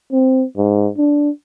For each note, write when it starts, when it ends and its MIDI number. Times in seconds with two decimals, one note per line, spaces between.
0.12 0.45 60
0.57 0.89 44
0.98 1.30 62